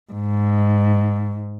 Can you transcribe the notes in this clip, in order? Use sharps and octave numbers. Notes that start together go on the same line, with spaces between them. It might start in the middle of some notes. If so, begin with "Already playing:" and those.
G#2